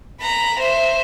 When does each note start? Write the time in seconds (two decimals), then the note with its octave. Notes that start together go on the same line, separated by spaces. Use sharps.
0.21 A#5 B5
0.60 C5 E5